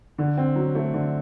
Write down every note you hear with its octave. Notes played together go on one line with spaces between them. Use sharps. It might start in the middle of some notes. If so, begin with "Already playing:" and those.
D3
C4
F#3
A3
D3